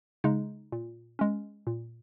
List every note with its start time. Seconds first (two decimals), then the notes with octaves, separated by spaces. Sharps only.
0.24 C#3 G#3 D#4
0.72 A#2
1.19 G#3 C#4
1.67 A#2